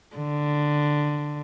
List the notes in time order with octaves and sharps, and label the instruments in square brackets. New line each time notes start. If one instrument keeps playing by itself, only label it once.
[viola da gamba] D3